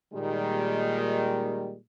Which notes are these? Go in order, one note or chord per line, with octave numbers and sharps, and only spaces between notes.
A#2 D#3 G3 G#3